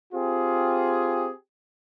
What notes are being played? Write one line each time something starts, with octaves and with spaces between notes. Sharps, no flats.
C4 F4 G4 G#4